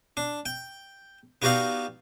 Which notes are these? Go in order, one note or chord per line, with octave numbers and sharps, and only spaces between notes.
D4
G5
B3 D#4 F#4 G4 D5 F5